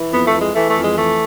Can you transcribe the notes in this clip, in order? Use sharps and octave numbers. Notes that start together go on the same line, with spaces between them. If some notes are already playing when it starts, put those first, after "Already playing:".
Already playing: E3
F2 B3
A3
E3
G#3
E3 A3
A3
F2
G#3
E3 A3